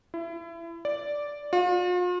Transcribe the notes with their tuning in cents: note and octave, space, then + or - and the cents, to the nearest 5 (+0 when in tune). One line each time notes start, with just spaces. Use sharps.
E4 +30
D5 -5
F4 +40